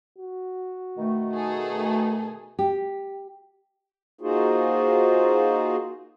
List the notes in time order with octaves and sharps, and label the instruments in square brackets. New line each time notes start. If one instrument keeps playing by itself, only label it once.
[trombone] F#4
[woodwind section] B2 D#3 A3
[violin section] D#4 G#4 A4
[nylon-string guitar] G4
[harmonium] A#3 D#4 F4 F#4 G#4 C5